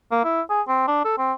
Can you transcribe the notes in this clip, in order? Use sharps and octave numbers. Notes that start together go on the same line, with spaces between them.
A#3
E4
G#4
C4
D4
A4
C4